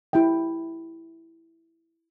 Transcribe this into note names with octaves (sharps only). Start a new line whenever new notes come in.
E4 G4 E5 G5